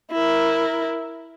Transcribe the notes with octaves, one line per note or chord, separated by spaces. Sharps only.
E4 A#4